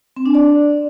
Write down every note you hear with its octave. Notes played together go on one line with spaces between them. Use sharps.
C4
D4
D5